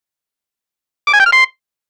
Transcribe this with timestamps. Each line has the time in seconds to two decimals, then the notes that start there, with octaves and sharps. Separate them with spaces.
1.07 D6
1.13 G#5
1.20 G5
1.26 F6
1.32 C6